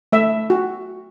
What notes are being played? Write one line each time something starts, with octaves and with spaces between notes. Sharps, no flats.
A3 E5
F#4